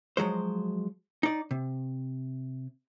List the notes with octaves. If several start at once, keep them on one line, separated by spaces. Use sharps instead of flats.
F3 F#3 G#3 C5
D#4 D5
C3